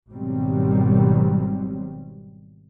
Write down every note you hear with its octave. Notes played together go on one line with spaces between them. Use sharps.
G#1 B2 D#3 F#3 G3 C4